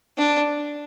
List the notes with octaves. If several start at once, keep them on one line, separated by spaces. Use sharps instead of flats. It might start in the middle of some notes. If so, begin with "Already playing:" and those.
D4